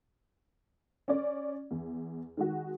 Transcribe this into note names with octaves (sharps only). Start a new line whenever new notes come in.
C#4 D5
E2
D#3 G#3 F#4